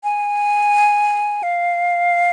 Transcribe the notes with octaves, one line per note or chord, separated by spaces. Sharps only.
G#5
F5